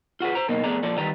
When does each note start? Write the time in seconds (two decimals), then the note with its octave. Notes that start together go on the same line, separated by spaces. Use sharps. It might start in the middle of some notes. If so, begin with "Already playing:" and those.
0.20 F4 F#4 G#4 B4
0.35 C5 A#5
0.48 F#2 B2 A#3 D#4
0.64 F2 A3 B3 G#4 D5 A#5
0.83 A#2 F3 A4 D5
0.98 D#3 G3 B4 A#5